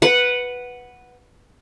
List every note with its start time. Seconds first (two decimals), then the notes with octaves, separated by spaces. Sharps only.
0.02 B4 F#5